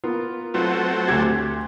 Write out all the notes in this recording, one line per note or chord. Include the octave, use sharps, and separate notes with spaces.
A#3 B3 F4
F#3 A3 C4 F4 B4
D2 G4 G#6